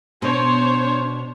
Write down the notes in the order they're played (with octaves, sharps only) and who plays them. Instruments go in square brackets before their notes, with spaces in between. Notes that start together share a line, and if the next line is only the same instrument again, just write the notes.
[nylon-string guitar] B2 [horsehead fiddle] D4 [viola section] C5 C#5